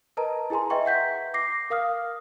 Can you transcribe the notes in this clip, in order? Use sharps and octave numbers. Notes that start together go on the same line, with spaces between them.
A#4 B4 D#5 A5 A#5
E4 G#4 G#5 A#5 C6
B4 D#5 E5 G5 C#6
E5 F#5 G6 B6
D6 A#6 C7
A#4 F5 D#6 F6